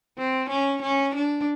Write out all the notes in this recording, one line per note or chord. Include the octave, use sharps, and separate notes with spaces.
C4
C#4
C#4
D4